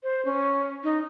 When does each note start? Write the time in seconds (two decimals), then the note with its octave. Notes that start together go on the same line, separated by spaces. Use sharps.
0.03 C5
0.25 C#4
0.84 D#4